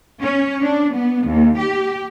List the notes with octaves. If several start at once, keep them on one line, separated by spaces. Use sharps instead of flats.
C#4
D4
B3
D#2
G4